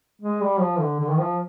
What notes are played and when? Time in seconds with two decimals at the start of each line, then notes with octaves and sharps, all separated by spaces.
0.22 G#3
0.41 G3
0.60 F3
0.80 D3
1.00 D3
1.10 D#3
1.18 F3